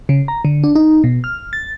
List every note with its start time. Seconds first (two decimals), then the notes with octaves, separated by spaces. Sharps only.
0.09 C#3
0.28 A#5
0.45 D3
0.64 D4
0.75 D#4
1.04 B2
1.24 F6
1.53 A6